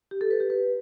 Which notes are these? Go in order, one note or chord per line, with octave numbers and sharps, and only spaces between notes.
G4
A4
B4
G4
B4